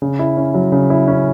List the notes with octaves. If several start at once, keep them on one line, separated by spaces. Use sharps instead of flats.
C#3
E4
C#4
F#3
C#3
E4
C#4